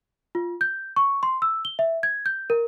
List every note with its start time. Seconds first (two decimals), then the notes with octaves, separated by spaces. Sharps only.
0.35 F4
0.61 G6
0.96 C#6
1.23 C6
1.42 E6
1.65 G7
1.79 E5
2.03 G#6
2.26 G6
2.50 A#4